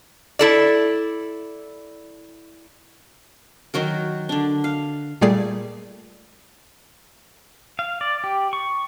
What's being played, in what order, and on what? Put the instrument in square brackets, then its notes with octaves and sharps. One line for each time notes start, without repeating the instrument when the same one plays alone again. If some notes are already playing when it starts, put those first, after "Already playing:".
[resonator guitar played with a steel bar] E4 A4 D5
[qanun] D#3 F#3 F#4 A#4
D3 D4
F5
[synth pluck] A#2 G3 A3 G#4 D5 C7
[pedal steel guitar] F5
D5
G4
C#6